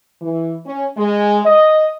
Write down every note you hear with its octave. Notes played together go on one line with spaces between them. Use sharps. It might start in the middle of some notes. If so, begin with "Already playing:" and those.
E3
C#4
G#3
D#5